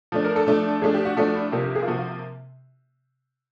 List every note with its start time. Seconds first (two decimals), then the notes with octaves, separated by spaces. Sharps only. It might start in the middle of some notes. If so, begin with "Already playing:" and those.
0.12 F3 A3 D4
0.24 A#4
0.36 A4
0.47 F3 A3 D4
0.82 F3 A3 D4 G#4
0.94 G4
1.05 F#4
1.17 F3 A3 D4 F#4
1.35 E4
1.52 C3 F3 A#3 G4
1.64 G4
1.75 G#4
1.82 F4
1.87 C3 F3 A#3 F#4
1.98 F4